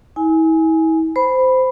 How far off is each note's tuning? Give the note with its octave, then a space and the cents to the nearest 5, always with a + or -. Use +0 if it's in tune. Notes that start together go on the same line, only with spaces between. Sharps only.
E4 -40 G#5 +5
C5 -15 B5 +0